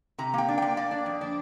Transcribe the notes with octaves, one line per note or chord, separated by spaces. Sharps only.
C3 A#5
A#3 G5
D4
A#3 G5
A#3 D5
D4
F2
D4